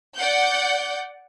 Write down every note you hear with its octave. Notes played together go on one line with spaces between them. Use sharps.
D5 F#5 G6